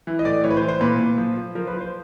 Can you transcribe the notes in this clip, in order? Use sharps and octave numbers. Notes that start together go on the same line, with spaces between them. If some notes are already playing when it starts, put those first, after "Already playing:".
E3
D#5
A2 D5
E3 C#5
B4
C5
E3
C5
A#2 B4
A#2
F3
F3
F3 A#4
B4
F3
C5